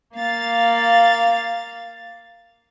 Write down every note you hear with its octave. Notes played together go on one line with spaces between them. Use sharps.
A#3 F5 A6